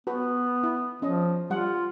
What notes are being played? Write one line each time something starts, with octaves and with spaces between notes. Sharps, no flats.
B3 F#4 B4
E4
F3 C#4 D#5
G3 F4 F#5